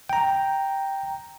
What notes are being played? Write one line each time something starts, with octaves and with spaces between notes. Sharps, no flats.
G5 A#5